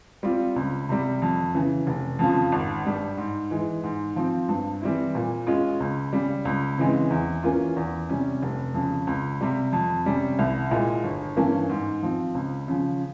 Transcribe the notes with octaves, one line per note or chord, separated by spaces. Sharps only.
G3 C4 F4
C#2
C3 G3
F2
C#3 E3
F1
F2 C#3 F3
G#1
G2 G3
G#2
E3 G#3
G#2
F3 C4
G2
E3 G3 C4 E4
A#2
G#3 C#4 F4
C#2
C#3 G3
C#2
C#3 E3 G#3 C4
E2
E3 A#3 C#4 F4
E2
C3 G3 C#4
F1
F2 C#3
C#2
C3 G3
F2
C3 G3 C#4
C2
A#2 G#3 E4
G1
G2 E3 A#3 C#4
G#2
F3 C4
C#2
C#3 F3